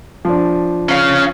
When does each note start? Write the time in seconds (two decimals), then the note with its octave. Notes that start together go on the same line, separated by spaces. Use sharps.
0.25 F3 D4
0.89 C#4 F5